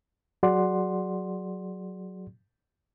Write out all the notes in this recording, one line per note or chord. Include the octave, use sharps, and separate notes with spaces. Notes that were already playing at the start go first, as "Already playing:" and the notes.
F#3 F#4 G#4 D5 F#5 C6